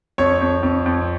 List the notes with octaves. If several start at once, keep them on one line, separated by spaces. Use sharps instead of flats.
F2 C#5
F2
F2
F2